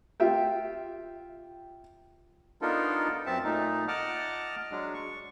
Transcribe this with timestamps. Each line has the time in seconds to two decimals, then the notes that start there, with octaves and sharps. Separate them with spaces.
0.20 F4 G4 E5 G5
2.62 B3 D4 D#4 F4 A4 A#4
3.26 F#2 C4 E5 A5
3.44 A#2 A3 D#4
3.88 D#5 F#5 A5 D6 F6
4.71 F#3 G#3 D4
4.94 C#6